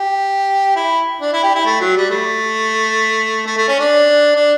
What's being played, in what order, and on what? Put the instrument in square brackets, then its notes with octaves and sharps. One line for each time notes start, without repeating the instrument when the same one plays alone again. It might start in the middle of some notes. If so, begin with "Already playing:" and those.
Already playing: [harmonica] G4
E4
D4
E4
G4
E4
A3
F#3
G3
A3
A3
A3
C#4
D4
D4